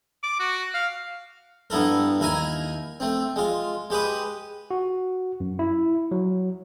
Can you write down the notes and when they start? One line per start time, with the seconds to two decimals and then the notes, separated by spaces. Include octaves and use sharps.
0.23 D6
0.40 F#4
0.74 F5
1.70 G2 B3 E4 A4 A#4
2.20 D#2 E4 A#4 G#5 A#5
3.00 A3 C4
3.36 G#3 F4
3.90 G#3 G4 B4 D#6
4.71 F#4
5.40 F#2
5.59 E4
6.11 F#3